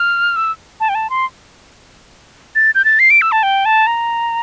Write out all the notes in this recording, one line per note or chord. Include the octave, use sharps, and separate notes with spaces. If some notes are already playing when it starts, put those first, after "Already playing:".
Already playing: F6
E6
A5
G5
A5
C6
A6
G6
A6
C7
D7
E6
A5
G5
A5
A#5